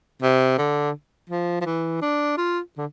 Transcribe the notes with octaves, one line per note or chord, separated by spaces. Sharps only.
C3
D3
F3
F3
E3
D4
F4
D3